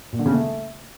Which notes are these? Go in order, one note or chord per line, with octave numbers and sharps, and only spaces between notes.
A#2
D3
C#3
A3